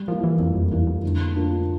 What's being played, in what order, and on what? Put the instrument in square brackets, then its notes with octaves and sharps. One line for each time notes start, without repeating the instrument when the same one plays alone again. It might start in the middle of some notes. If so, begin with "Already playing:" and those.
Already playing: [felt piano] G3
[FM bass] F3 [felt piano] A#3 E4
[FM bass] E3
[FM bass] F2 [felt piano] G3
[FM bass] F2
[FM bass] E2 [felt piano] A#3 E4
[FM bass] F2
[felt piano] D3
F3 A#3 D4